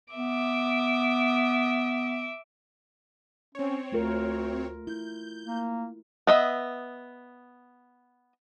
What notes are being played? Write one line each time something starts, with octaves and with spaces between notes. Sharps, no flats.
B3 E5 D6
C4 C#4 C#5
D2 A3 F4 A#4
E4 G6
A#3
B3 D#5 E5